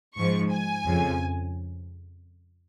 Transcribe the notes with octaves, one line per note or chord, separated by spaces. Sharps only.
G#2 F3 C#6
G#5
F2 C#3 F3